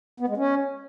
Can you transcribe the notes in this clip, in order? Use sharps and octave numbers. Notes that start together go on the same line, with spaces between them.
B3
G#3
C#4